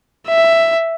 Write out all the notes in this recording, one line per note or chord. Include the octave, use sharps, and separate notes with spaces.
E5